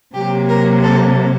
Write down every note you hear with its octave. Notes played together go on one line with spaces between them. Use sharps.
C3 F#3 A#3 G4
A#4
A4